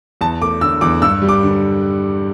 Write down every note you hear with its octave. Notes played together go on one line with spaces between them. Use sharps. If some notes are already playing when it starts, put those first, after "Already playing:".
E2 A5
A3 D6
D3 E6
E2 D6
G2 E6
G3
D6
D3